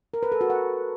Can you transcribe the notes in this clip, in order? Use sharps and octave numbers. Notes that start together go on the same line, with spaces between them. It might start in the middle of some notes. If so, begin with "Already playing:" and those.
A#4
B4
A4
F#4
F#5